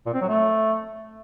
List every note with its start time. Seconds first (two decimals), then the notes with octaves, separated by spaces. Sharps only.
0.06 A#2
0.14 C4
0.21 F#3
0.29 A3